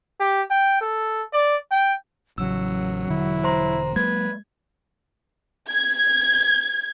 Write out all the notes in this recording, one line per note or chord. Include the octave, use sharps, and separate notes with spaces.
G4
G5
A4
D5
G5
A1 C#3 F#3 E6
E1 D3 E4
C5 A#5 C6
F#3 G#3 A#3 B4 G#6
G#6